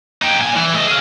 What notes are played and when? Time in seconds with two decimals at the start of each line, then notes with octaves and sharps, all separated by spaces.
0.22 D#4 G4
0.39 A#2 G#5
0.57 E3
0.75 A3 D#5
0.87 G#4 F5